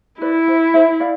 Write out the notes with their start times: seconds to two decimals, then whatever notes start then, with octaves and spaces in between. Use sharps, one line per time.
0.21 E4 B4 D5
0.48 C5 E5
0.74 C5 E5
1.00 D5 F5